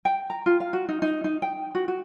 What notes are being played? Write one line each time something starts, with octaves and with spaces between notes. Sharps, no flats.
G5
A#5
F4
F5
F#4
D#4
D#4
D#4
G5
F#4
F#4